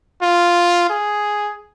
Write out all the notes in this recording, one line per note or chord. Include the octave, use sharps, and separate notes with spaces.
F4
G#4